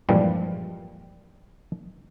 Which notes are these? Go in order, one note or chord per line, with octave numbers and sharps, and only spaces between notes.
G2 A#2 E3 F3 G3 G#3